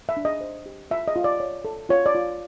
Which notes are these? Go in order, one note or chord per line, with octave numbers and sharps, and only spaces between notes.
E5
D4
D#5
C5
G4
F4 E5
D#5
F4
D5
C#5
A4
F4 C#5
D5
F4